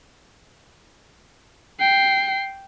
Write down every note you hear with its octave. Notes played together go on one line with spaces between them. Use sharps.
G5 C7